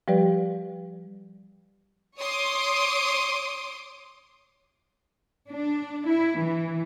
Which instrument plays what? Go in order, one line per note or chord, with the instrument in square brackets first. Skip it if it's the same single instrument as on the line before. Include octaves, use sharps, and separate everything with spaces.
[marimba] F3 G3 G4 B4 D5
[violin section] C#5 C6 D6 D#6
[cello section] D4
E4
E3